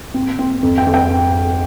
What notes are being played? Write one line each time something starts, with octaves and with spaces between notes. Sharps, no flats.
C4
C4
F2
G5
F2
G5